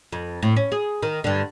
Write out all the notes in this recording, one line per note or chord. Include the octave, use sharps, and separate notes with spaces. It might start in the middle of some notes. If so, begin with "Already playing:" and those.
F2
A2
C#4
G#4
D#3
G2 D3